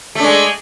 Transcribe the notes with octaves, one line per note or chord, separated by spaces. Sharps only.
G#3 A3 D4